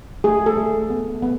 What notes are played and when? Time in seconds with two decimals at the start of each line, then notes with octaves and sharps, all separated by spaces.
0.24 A3 G#4
0.46 A4
0.57 A3
0.90 B3
1.22 B3